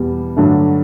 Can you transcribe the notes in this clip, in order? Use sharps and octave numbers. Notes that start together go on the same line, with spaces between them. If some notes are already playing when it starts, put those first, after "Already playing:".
Already playing: E2 B2 G3
G2 D3 F#3 A3 D4